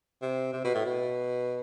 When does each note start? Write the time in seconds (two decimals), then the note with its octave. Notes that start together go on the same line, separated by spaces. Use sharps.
0.22 C3
0.53 C3
0.64 B2
0.75 A2
0.86 B2